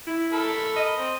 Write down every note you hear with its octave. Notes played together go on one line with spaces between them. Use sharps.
E4
A4 A#4 B5
D#5
C4